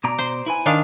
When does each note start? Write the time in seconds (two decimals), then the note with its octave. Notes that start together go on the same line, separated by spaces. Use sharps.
0.04 B2 D5 A#5
0.18 C5
0.46 E4 B4 G#5
0.66 D#3 D4 F5